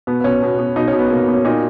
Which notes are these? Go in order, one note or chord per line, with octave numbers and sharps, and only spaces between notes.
B2 B3
B3
B2 C#4
B2
B2
B2 D#4
C#4
B2
B3
B2 A#3
B3
B2
C#4
A#2 D#4